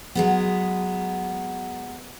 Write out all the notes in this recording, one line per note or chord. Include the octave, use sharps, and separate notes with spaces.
F#3 G#3 B3